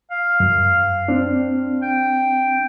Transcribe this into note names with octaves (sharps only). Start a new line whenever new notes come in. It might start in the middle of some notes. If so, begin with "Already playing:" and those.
F5
F#2
C4 D4
G5